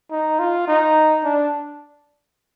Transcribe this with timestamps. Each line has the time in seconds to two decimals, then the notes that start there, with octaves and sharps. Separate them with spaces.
0.11 D#4
0.39 F4
0.67 D#4
1.24 D4